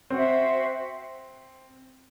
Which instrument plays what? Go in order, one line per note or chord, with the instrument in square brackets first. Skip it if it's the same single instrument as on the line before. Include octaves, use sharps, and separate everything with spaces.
[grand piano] C4 [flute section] F#4 C5 E5